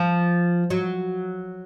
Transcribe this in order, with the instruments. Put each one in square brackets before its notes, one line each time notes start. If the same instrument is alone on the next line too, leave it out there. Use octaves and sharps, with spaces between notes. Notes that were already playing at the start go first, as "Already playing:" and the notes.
Already playing: [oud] F3
F#3